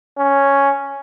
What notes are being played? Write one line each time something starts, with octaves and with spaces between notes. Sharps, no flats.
C#4